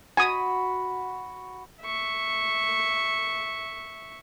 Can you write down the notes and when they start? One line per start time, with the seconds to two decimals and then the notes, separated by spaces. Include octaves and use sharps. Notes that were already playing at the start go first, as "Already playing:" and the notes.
0.17 F#4 G#5 B5 D#6
1.82 E5 C#6